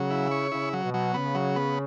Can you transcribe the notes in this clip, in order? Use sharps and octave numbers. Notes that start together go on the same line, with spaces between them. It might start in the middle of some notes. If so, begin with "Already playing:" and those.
Already playing: C#3 F#3
E4
C#5
C#3 E4
F#3
B2
F#3
C#3 B3
F#3
B3